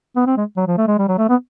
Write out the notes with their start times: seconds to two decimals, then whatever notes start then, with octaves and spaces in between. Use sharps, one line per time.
0.16 B3
0.26 C4
0.37 G#3
0.57 F#3
0.67 F3
0.78 A3
0.87 G#3
0.98 G3
1.08 F#3
1.18 A3
1.29 B3